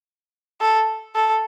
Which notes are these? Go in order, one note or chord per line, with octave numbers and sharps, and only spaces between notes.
A4
A4